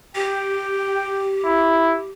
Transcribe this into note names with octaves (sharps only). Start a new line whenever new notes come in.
G4 G5
E4